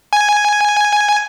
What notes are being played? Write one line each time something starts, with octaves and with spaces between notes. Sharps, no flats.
G#5